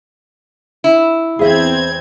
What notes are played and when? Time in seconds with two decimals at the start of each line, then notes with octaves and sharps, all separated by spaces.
0.84 E4
1.39 E2 C4 G#4 E5 G#6